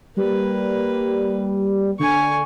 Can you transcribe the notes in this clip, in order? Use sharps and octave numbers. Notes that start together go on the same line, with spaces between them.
G3 A#3 B4
D3 G#5 C#6